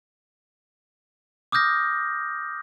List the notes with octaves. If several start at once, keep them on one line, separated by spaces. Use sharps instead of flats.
D6 D#6 F6 G6 A#6